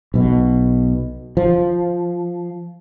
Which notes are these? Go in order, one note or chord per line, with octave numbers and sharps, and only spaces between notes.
B1 B2
F3